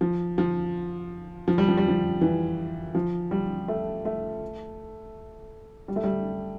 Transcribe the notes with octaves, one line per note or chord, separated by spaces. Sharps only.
F3
F3
F3
G3
F3
G3
F3
E3
F3
G3
A3
A3
G3
A3
G3